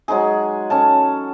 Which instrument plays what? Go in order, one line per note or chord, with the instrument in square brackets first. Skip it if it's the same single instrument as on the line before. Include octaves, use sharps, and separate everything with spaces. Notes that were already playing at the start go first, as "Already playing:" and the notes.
[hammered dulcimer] F#3 G#3 D#4 G#4
C#4 A4 A5